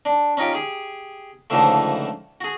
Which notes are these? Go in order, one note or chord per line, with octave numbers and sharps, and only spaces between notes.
D4
C#4 D#4 F4 G4
G4 G#4
C#2 G#2 D3 E3 F3 A3
F#4 G#4